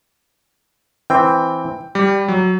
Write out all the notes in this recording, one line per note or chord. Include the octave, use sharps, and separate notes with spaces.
E3 C4 G5
G3 G4
F#3